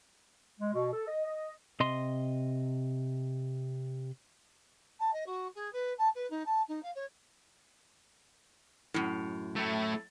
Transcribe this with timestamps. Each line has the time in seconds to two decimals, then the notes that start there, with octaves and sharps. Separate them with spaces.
0.60 G#3
0.74 B2
0.93 A4
1.08 D#5
1.26 D#5
1.80 C3 D#5 C6
4.99 A5
5.13 D#5
5.26 F#4
5.55 G#4
5.72 B4
5.98 A5
6.15 B4
6.30 D#4
6.46 A5
6.68 D#4
6.83 F5
6.95 C#5
8.94 F#2 A2
9.56 A3 E4